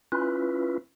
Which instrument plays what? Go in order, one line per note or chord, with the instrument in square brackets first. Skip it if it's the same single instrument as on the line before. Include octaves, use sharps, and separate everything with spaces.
[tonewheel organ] C#4 E4 F4 B4